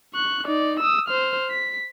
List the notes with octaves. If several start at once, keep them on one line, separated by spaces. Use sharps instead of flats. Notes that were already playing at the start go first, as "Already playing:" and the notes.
C#6 F#6
D#4 D5
D#6 E6
C5 F6
B6